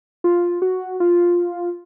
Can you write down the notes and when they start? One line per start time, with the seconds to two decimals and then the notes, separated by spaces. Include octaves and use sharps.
0.24 F4
0.62 F#4
1.00 F4